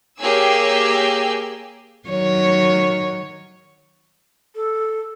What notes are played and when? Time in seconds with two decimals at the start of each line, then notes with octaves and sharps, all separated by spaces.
0.18 A#3 G4 G#4 C#5 G#5 E6
2.08 D#3 F#3 C#5
4.55 A4